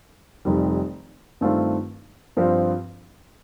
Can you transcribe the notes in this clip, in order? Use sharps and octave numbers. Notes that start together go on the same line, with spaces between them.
F1 F2 D#3 G3
G2 D#3 A3 C4 F4
G2 F3 C4